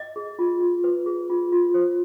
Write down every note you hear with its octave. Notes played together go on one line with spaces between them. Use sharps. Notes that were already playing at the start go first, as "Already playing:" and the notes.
Already playing: D#5
G#4
F4
F4
B4
G#4
F4
F4
C5